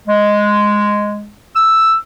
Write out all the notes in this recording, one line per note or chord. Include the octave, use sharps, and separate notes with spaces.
G#3
E6